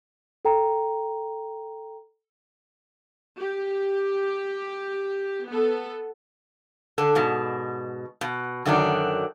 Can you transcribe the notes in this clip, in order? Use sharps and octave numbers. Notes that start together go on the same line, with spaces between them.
A4 G5 A#5
G4
B3 A4
D3 A4
G#2 B2
B2
F#2 D3 D#3 F#3 D4